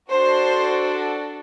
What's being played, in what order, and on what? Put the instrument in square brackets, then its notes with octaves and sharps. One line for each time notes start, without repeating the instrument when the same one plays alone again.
[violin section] D4 F#4 A4 C5